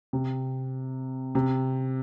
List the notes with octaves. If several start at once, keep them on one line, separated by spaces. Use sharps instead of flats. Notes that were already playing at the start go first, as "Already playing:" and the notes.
C3
C3